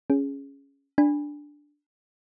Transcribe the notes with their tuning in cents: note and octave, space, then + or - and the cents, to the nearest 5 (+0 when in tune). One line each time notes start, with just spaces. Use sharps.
C#4 +0 G#4 +0
D4 +0 G#5 -30 B5 +0